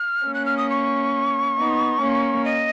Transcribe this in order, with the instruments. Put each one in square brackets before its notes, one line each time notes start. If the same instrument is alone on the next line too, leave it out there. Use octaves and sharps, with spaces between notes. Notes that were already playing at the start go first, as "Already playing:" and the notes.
Already playing: [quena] F6
[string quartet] A#3 C#4
[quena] F#6
F6
D#6
C#6
[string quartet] B3 D#4
A#3 C#4
[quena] D#5